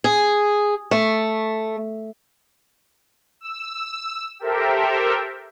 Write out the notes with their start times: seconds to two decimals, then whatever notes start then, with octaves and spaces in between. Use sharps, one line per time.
0.04 G#4
0.91 A3
3.41 E6
4.39 G4 A4 A#4 C5 E5 G5